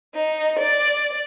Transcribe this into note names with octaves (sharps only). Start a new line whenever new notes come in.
D#4
D5